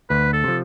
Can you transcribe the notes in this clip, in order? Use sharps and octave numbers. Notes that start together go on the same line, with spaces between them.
D2 B4
A4
C3 F3